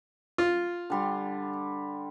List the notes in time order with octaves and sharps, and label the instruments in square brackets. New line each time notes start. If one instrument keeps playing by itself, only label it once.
[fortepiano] F4
[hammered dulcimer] D3 G3 C6